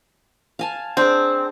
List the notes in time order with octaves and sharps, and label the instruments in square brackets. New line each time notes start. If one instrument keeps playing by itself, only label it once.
[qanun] F5 G#5 A5
[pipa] C4 [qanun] D4 G#4